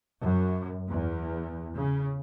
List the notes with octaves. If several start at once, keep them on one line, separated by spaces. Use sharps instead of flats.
F#2
E2
C#3